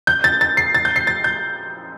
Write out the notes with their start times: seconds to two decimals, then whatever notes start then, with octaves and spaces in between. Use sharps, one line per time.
0.07 G6
0.24 A6
0.41 A6
0.57 C7
0.75 A6
0.85 G6
0.96 C7
1.07 A6
1.24 G6